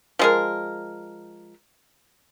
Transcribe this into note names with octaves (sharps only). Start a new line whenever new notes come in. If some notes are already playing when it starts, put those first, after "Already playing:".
F3 G#3 A#4